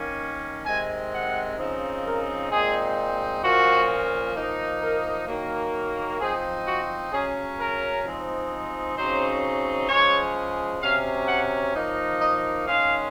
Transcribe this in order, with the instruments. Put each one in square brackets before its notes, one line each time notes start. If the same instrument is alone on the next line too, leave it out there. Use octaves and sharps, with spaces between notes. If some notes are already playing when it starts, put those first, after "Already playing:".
Already playing: [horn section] D#3 A#3 C#4
C3 D#3 G#3 C4 G#5
F#5
C#3 F3 C4 D#4
A#4
A#2 G#3 C4 D#4 G#4
A#2 F3 A#3 C#4 F#4
F3 A#3 D#4
A#4
D#3 F#3 A#3
F3 C4 D#4 G#4
F#4
C#3 F#3 C#4 G#4
A#4
F3 G#3 C4 D#4
C#3 F#3 C4 D#4 C5
C#3 F3 G#3 C#5
C3 F#3 C#4 F5
F#5
F3 A#3 D#4
D#5
D#3 G#3 C#4 F5